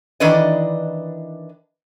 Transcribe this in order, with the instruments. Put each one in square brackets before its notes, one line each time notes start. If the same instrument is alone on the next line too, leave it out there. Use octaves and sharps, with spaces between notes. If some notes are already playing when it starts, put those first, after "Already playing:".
[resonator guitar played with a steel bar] D#3 E3 D4 B4 D5 D#5